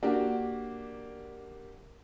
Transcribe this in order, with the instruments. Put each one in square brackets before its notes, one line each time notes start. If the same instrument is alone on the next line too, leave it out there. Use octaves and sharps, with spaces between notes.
[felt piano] A#3 D4 F#4 G4